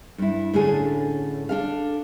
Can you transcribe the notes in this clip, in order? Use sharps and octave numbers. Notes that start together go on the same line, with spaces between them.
G2 E4
A2 D3 A3 C#4 D4 G#4
D4 A4 F5